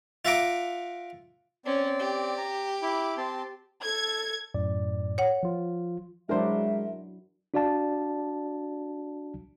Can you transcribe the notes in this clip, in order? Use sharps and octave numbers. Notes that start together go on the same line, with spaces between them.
F4 E5 F#5 A#5 D6
C4 C#4 D5
G4
A#5
E4 B5 D6
C4 A5 C6
A4 G#6
F#2 A2 D5
C#5 F#5
F3 F4
F#3 G#3 D4 E4 A#4 C5 E5
D4 F#4 D5 F5 A5